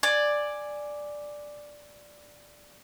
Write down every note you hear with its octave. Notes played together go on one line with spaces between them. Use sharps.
D5 G#5